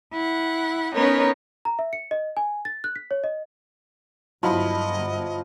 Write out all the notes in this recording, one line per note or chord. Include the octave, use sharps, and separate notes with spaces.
E4 F#5
B3 C#4 D#4 A#4 B4 C#5
A#5
E5
C#7
D#5
G#5
A6
F#6
B6
C#5
D#5
G1 F3 F#3 E4 D#5 B5